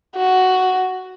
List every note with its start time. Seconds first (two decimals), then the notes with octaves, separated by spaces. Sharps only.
0.16 F#4